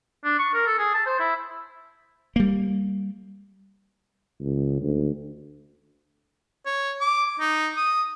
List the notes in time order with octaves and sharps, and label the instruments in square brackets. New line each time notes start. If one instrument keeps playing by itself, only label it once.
[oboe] D4
C#6
A#4
A4
G#4
A5
C5
E4
[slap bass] G3 A#3
[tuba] C#2
D2
[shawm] C#5
D6
D#4
D#6